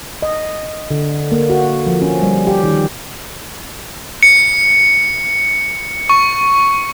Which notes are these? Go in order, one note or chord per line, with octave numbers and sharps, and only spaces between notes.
D#5
D3
A#3
F#4
F3
C#4
G3
G4
D#3
C#7
C#6